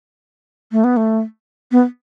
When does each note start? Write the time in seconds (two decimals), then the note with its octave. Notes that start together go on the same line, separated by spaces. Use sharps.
0.72 A3
0.84 B3
0.97 A3
1.72 B3